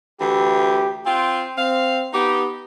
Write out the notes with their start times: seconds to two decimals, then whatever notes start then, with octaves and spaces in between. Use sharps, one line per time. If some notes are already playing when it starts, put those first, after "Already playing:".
0.21 D2 E3 G4
1.06 C4 F4 G5
1.58 C4 F5
2.14 B3 D#4 G4